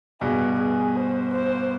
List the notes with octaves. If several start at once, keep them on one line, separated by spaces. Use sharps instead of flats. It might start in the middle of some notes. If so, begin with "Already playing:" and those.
G2 B2 G#4
G#4
C5
C5